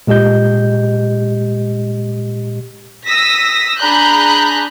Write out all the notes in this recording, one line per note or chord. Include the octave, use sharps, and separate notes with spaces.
A#2 G#3 G4 D#5 G6
D#6 E6 A#6 B6
D4 G#4 A#5 B5 F#6 G6